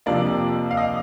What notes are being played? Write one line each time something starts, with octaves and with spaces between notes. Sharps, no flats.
F2 C3 F3 A#3 D4 D5
F5
D#5